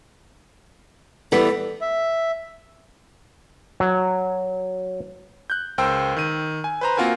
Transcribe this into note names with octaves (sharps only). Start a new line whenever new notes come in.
E3 G3 B3 A4
E5
F#3
F#6 G6
C#2 A#4 C5 G5 E6
D#3 D#7
G#5
B4 C5 A#5
A#3 C4 F4 F#4 A#4 G#5